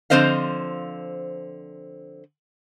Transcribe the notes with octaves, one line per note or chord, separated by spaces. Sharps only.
D3 F3 C4 C5 D#5 F5